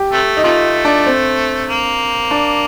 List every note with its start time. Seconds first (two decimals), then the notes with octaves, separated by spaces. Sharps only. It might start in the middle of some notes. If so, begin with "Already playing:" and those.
Already playing: G4
0.12 C3 A3
0.37 D#4
0.44 C3 A3 F4
0.85 D4
1.06 C4
1.68 A#3
2.31 D4